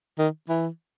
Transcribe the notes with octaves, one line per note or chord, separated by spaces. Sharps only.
D#3
E3